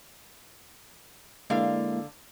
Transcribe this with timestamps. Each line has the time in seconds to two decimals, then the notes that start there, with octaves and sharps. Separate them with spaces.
1.50 D3 G#3 A#3 E4 F5